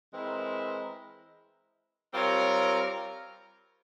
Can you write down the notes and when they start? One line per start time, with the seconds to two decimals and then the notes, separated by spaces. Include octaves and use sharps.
0.12 E3 G#3 C4 E4 A#4
2.12 G3 C4 F4 A#4 C#5